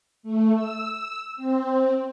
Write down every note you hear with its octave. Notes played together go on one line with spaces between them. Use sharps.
A3
E6
C4